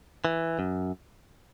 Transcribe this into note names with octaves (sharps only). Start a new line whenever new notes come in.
E3
F#2